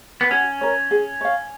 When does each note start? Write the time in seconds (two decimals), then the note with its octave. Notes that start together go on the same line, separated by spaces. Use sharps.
0.21 B3
0.31 C#4 F#4
0.61 A#4 C#5
0.91 G#4
1.21 C#5 F5